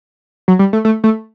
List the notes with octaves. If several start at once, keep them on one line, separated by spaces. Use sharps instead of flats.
F#3
G3
A3
A3
A3